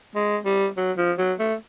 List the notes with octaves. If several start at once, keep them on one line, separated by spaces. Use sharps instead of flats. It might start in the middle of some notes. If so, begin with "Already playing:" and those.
G#3
G3
F#3
F3
F#3
A3